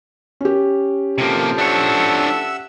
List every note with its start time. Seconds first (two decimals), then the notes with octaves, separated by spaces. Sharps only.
0.41 C#4 G4
1.18 C3 F3 A#3 A4
1.58 D4 C#5 E5 F#5 E6